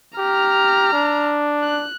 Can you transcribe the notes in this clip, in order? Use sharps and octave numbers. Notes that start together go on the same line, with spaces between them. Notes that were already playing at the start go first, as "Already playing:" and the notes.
G4 A#5 F6
D4
F#6